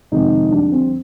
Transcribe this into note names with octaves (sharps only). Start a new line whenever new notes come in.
F2 C3 D#3 G#3 D#4
F2 D3 G3 D4
C4